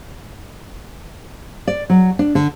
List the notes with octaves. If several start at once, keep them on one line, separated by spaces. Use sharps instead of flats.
D5
F#3
D4
D3